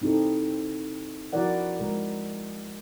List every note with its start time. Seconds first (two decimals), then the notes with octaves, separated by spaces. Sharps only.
0.02 C4 D#4 E4 G4 A4
1.33 F3 E4 F#4 A#4 D5 F#5
1.79 G#3 A#4